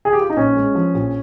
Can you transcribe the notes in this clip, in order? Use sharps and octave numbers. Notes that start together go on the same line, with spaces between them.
G#4
G4
F4
D#4
A#1 C#4
G#3
F3
A#1